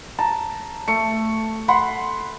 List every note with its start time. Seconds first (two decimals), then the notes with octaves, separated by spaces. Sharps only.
0.18 A5 A#5
0.88 A3 C#7
1.68 F#5 B5 C6